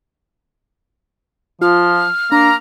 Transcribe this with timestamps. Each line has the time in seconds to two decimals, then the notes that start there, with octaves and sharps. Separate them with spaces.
1.62 F3 F4 F6
2.32 A#3 D4 A#5